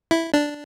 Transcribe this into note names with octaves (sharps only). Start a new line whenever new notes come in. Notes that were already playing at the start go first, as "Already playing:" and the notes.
E4
D4